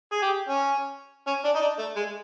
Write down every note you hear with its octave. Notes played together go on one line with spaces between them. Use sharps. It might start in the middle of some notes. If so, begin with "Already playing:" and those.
G#4
G4
C#4
C#4
D4
D#4
D4
A3
G#3